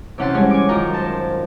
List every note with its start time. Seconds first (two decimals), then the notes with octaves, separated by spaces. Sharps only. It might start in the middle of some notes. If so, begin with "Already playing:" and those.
0.18 C3 E3 C#4 F#5 A5 C6
0.34 G3 G#3 C#4 C#5
0.51 G#5 D6
0.69 F#2 D#3 F4 A#5 C#6
0.94 C5 A5